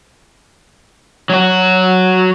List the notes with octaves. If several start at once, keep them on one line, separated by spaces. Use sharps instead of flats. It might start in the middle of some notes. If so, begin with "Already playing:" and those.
F#3 F#4